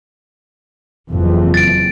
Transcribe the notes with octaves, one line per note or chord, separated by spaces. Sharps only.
F#1 F2 E3
A6 D7